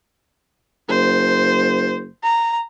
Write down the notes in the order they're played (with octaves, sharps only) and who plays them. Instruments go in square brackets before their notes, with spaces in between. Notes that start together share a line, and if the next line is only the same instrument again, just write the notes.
[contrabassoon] F#1 [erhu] C5
[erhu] A#5